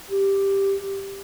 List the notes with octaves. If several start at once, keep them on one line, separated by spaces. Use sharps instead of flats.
G4